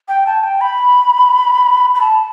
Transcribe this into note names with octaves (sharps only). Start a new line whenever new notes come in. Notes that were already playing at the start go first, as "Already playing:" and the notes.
G5
A5
G5
B5
B5
A5